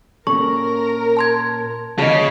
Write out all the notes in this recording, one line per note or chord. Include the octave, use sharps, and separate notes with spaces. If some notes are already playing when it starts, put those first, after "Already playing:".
A#2 C#4 A4 A#4 C#6
A5 C6 G#6
D#2 C#3 F4 G#4 D#5 A5